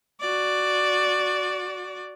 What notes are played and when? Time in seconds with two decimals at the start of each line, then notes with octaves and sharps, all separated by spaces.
0.20 F#4 D5